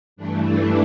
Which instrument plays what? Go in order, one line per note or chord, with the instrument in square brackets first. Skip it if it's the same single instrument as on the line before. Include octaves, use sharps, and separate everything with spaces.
[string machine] G2 E3 A3 D4
D4